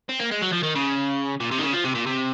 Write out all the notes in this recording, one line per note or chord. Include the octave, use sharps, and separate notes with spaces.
C4
A#3
G#3
F#3
F3
D#3
C#3
A#2
C3
D#3
C#3
F3
C3
A#2
C3